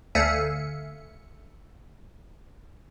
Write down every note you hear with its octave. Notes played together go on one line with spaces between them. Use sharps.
D2 A3 E5 F5 G#5 C#7